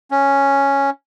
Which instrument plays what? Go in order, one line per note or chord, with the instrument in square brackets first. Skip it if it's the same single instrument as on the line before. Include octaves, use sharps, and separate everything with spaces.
[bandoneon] C#4